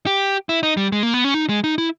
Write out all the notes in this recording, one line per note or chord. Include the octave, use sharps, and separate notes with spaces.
G4
E4
D#4
G3
G#3
A#3
B3
C#4
D#4
G#3
D#4
E4